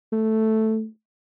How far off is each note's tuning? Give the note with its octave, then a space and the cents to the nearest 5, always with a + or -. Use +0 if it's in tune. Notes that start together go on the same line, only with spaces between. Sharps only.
A3 +0